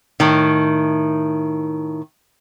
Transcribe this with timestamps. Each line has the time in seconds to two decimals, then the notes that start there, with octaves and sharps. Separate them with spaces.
0.20 A2 D#3